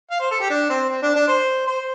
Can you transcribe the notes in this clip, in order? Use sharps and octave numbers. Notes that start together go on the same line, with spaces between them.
F5
C5
A4
G4
D4
C4
C4
D4
D4
C5
C5